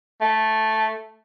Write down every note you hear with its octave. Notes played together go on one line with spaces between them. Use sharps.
A3